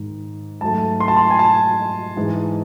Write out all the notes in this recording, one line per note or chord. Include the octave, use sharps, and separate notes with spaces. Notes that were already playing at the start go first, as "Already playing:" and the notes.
Already playing: G#2 D#3
G#2 F#3 A3 A5
C6
A5
C6
G#5
A5
G#2 E3 G#3